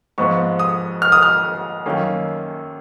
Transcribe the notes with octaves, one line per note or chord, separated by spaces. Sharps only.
G#2 F3 B3 C#6
D#6
F6
D#6
F6
F#2 D#3 A#3 C#4